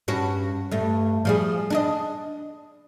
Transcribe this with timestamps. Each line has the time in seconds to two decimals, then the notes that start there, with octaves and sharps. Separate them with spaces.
0.08 G2 C#4 F#4
0.71 G2 A3
1.25 F3 G3 G#4
1.70 D4 G#4 D#5